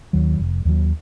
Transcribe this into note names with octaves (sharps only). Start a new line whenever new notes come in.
D#2 D#3 F#3
F1
D#2 D#3 F#3